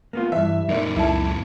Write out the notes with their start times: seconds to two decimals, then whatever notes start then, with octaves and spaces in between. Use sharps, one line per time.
0.13 A#3 B3 F4
0.32 G2 E3 E5
0.69 F#2 A#2 D#4 A#4 D5
0.96 C#2 F#3 E4 A5